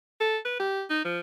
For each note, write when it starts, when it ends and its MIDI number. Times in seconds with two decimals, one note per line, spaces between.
0.20 0.37 69
0.45 0.59 71
0.60 0.83 67
0.90 1.04 63
1.05 1.20 53